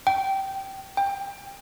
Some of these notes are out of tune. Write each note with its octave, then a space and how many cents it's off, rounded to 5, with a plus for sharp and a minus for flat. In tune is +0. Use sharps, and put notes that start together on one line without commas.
G5 -15
G5 +20